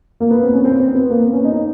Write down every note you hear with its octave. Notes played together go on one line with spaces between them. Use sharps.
A#3
B3
C4
C#4
C4
C4
B3
A#3
B3
C#4
D#4